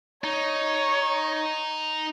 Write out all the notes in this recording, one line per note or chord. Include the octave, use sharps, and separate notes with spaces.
D#4 C#5